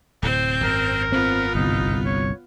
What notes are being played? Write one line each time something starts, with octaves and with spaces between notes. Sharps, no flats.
D1 A2 C3 C4 C5
G#1 F#2 A#4
B3 C4 F4
G1 C2 D#4
C#5